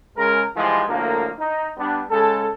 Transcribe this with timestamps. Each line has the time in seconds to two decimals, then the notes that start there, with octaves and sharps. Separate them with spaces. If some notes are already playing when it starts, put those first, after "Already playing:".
0.16 C#3 G#3 A#4
0.55 G#2 E3 F3 G3 G#3
0.88 D2 A2 F3 A#3
1.39 D#4
1.78 G3 B3 D4
2.10 C#3 G#3 A4